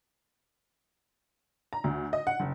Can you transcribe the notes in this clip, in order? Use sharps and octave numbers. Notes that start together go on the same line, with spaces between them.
A#5
D2
D#5
F#5
F#1